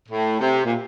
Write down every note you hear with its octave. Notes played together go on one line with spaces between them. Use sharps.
A2
C3
A#2